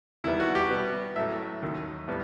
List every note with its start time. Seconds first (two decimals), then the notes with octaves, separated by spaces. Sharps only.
0.24 E2 D#3 G3 B3 E4
0.40 F#4
0.55 G4
0.70 B2 G3 B3
1.16 A2 F#3 A3 E5
1.62 D#2 D#3 F#3
2.08 A2 G3 B3